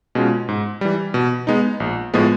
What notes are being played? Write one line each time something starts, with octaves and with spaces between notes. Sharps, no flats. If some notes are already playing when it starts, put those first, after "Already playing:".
B2 G#3 C#4 F4
G#2
E3 G3
B2
G#3 B3 D#4
A#1
A2 F3 G#3 B3